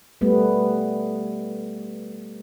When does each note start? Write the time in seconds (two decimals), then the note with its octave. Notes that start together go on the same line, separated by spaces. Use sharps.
0.21 G3 A3 B3